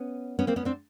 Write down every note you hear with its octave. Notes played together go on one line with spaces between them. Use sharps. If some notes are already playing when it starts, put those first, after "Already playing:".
Already playing: B3 C#4
B3 C#4
A#3 C4
B3 C#4
C4 D4